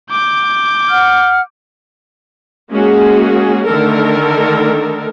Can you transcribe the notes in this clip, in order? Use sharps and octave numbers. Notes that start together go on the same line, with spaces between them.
D6 G6
F#5 F6
G#3 A#3 C#4 F#4 G#4
D3 D#3 A3 A4 A#4